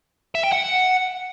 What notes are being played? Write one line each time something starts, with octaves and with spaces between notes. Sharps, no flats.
E5
G5
F#5